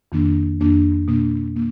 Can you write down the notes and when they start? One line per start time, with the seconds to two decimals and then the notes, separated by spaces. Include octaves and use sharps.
0.12 F2 D#3 A#3 D4
0.60 F2 D#3 A#3 D4
1.08 B2 A#3 D4
1.56 B2 A#3